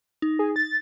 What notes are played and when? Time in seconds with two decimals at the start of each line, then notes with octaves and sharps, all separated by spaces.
0.22 D#4
0.39 G#4
0.56 A6